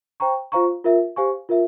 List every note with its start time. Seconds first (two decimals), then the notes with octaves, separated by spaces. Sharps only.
0.20 C5 G5 A#5 C#6
0.52 F4 C5 F5 A#5 C#6
0.84 F4 A#4 E5
1.16 G4 C5 F5 G#5 C#6
1.49 F4 A#4 E5